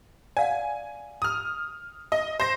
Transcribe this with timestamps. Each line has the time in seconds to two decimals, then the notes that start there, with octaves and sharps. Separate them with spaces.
0.37 D5 F5 F#5 G#5
1.22 D#6 F6
2.12 D#5
2.40 C5 A#6